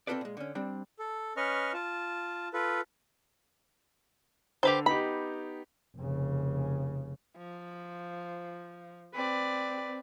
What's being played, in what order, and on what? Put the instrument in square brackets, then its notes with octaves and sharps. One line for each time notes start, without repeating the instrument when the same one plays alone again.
[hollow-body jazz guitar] C4 D4 F4 A4 B4 D5
A#2 G#3
D3 C#4
G3 C4 D4
[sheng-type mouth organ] A4
C#4 B4 D#5 C#6 F6
F4 A5
F4 A4 B4
[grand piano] D3 F7 [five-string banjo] G4 B4 C5
[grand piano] B3 D#4 G4 [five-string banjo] B5
[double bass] F1 C#3
[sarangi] F3
[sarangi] C4 [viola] B4 D5